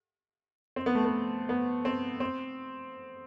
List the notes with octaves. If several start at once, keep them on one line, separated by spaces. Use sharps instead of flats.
C4
B3
A3
B3
B3
C4
C4